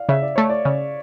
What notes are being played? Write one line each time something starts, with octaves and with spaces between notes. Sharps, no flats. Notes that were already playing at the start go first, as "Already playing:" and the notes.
Already playing: D5 F5
C#3 E5
D5
A3 C#5
D5
C#3